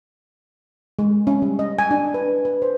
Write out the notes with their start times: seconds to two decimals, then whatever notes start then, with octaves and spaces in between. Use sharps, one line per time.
0.99 G#3
1.27 C#4
1.42 G3
1.59 D#5
1.79 G#5
1.91 D4
2.14 B4
2.45 B4
2.62 C5